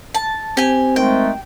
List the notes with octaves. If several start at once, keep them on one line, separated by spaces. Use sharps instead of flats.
A5
C4 G4 G#5
D#3 G#3 A3 G5